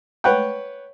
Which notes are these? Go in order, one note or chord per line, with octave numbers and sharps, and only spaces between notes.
B4 C#5 F#5 G5